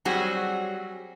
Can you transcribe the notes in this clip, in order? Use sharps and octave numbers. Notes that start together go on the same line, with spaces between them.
F#3 G3 C4 F#4 G#4